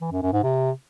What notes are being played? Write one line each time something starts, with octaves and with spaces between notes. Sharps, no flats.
E3
F#2
F#2
G#2
C3